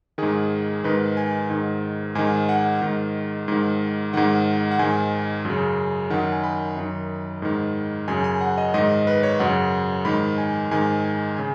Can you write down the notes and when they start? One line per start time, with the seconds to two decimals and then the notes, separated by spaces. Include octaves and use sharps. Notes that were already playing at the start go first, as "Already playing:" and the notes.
0.18 G#2 D#3 G#4
0.84 G#2 D#3 B4
1.17 G#5
1.50 G#2 D#3
2.15 G#2 D#3 G#5
2.49 F#5
2.82 G#2 D#3
3.48 G#2 D#3
4.13 G#2 D#3 F#5
4.71 F#5
4.79 G#2 D#3 G#5
5.45 F#2
5.50 C#3
6.10 F#2 D#3 F#5
6.32 G#5
6.44 B5
6.77 F#2 D#3
7.42 G#2 D#3
8.08 F#2 C#3 G#5
8.24 G#5
8.41 F#5
8.58 D#5
8.74 G#2 D#3 D#5
9.07 B4
9.23 C#5
9.39 F#2 C#3 F#5
10.05 G#2 D#3 B5
10.38 G#5
10.71 G#2 D#3 G#5
11.05 G#5
11.36 C#3 G#5